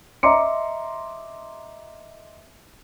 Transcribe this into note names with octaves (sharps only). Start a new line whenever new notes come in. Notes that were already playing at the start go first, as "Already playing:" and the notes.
D#5 E5 A#5 C6 D6 C#7